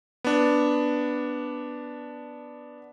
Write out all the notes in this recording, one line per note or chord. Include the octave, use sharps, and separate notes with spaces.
B3 D4